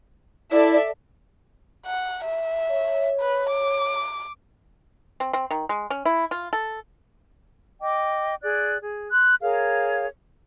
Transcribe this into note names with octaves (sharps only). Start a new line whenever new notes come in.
E4 A4 D5 E5
F#5
E5
C#5
B4
D6
C4
C4
D#3
G#3
C#4
E4
F4
A4
D#5 G5 D6
G#4 D5 F#6
G#4
C6 F#6
G#4 A#4 C#5 F5